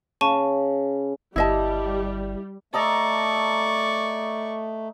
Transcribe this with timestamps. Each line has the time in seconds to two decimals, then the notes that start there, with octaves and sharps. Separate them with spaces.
0.21 C#3 A5 C#6 D#7
1.36 G1 G3 E4 D#5 A5
2.74 A3 A4 D5 D#5 A#5 C#6